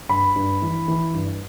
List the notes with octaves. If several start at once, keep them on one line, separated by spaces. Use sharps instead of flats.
G2 B5
G2
E3
E3
G2